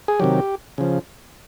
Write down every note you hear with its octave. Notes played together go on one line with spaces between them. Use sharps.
G#4
C3 D#3 F#3 G4
C#3 F3